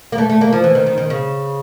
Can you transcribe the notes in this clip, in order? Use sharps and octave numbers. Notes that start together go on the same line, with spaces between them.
A#3
A3
A3
A#3
F3
E3
D#3
D#3
D#3
C#3